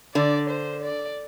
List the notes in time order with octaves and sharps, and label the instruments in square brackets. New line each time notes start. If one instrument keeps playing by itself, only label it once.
[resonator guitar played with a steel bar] D3 [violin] D5
[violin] C5
D5